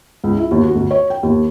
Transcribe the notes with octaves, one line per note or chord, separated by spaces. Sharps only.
C#2
E4
D#2
F#4
D2
C#5
G5
D#2